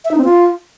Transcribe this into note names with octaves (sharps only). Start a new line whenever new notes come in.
E5
D#4
C4
F4